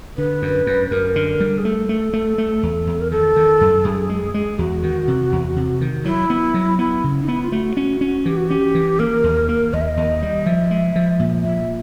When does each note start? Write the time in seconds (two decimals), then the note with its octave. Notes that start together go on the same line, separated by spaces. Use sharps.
0.18 D3 B4
0.42 F#2
0.67 F#2
0.91 F#2 A#4
1.16 D3
1.40 G3
1.58 G#4
1.64 A3 A4
1.89 A3
2.13 A3
2.38 A3
2.63 E2
2.87 E2
3.00 A#4
3.11 D#3 A4
3.36 D#3
3.61 F#2
3.85 F#2 G#4
4.10 G#3
4.34 G#3
4.59 E2 F#4
4.83 D#3
5.08 C3
5.32 E2
5.56 C3
5.81 D#3
6.05 F#3 E4
6.30 B3
6.54 F#3
6.79 B3 E4
7.04 C#3
7.21 D#4
7.28 B3 E4
7.43 F4
7.52 A3 F#4
7.77 C#4
8.01 C#4
8.26 E3 G4
8.37 F#4
8.49 C#4 G4
8.75 E3
8.99 A#3 A#4
9.24 D#2
9.49 A#3
9.73 D#2 D#5
9.81 E5
9.88 D#5
9.97 D#2
10.22 G3
10.46 F3 E5
10.71 G#3
10.96 F3
11.19 A#2
11.44 A#2 E5